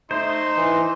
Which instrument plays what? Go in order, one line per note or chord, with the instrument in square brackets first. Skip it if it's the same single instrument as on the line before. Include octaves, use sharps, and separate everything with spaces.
[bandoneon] A3 [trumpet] D#4 [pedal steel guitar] C5 [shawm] C6
[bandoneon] E3